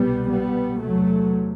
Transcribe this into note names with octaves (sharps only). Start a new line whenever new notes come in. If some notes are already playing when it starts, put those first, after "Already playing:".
Already playing: C2 B2 G3 B3
G3 B3
E2 C3 F#3 A3